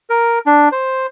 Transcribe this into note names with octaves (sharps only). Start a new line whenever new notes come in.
A#4
D4
C5